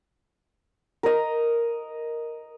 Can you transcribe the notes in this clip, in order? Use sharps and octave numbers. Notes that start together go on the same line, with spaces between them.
A#4 D#5